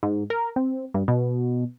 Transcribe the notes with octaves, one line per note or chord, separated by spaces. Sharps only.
G#2
A#4
C4
G2
B2